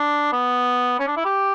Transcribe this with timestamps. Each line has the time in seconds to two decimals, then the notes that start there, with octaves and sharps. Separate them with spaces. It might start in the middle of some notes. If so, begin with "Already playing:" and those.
Already playing: D4
0.32 B3
0.99 C#4
1.07 D4
1.17 E4
1.25 G4